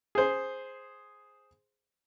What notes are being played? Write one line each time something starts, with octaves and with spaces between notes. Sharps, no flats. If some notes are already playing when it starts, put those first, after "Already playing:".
G#4 C5